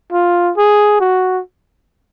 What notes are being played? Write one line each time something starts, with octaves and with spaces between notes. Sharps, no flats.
F4
G#4
F#4